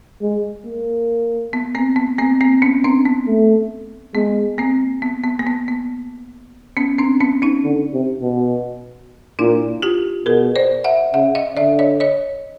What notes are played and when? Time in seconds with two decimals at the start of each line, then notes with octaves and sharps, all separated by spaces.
0.22 G#3
0.66 A#3
1.53 B3
1.75 A#3 C4
1.96 B3
2.19 A#3 C4
2.41 A#3 C4
2.62 B3 C#4
2.84 C4 D4
3.05 B3
3.27 A3
4.15 G#3 B3
4.58 A#3 C4
5.02 B3
5.24 B3
5.39 A#3
5.47 B3
5.68 B3
6.77 B3 C#4
6.98 C4 D4
7.20 B3 C#4
7.42 C#4 D#4
7.64 D3
7.93 C3
8.22 B2
9.39 A#2 D4 E4
9.82 F4 G4
10.26 B2 G#4 A#4
10.56 C5 D5
10.84 E5 F#5
11.14 C#3 E5 F#5
11.35 D#5 F5
11.57 D3 D5 E5
11.79 C#5 D#5
12.00 C#5 D#5